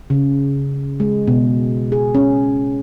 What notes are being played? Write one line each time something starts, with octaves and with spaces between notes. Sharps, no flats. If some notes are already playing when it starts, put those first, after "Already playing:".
C#3
G#3
B2
G#4
C#4